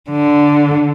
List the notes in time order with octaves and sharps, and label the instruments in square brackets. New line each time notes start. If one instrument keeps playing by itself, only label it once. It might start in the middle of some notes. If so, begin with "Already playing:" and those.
[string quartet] D3